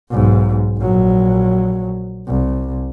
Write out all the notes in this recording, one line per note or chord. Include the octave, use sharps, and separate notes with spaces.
B1 G#2
A#1 F#3
C2